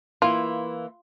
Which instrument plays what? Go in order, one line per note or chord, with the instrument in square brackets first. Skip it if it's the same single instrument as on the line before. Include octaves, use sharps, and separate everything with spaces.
[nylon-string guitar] E3 A#3 E4 [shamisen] F4